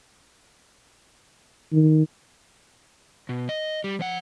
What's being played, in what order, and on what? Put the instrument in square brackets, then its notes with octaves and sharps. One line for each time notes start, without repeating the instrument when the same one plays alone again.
[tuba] D#3
[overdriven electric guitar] B2
D#5
G3
F3 F#5